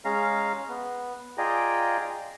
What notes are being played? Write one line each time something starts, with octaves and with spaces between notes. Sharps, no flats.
G#3 C#4 F5 A#5
B3
F4 G#4 D5 D#5 G5 A#5